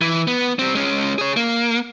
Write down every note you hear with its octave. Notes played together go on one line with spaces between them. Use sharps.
E3
B3
G3 C4
G#3 C#4
G#4 C#5
A#3